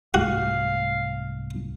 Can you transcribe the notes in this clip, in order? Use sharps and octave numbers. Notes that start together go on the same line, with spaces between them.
C2 G#2 A3 F#4 F5